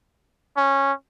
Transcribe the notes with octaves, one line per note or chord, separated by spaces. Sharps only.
C#4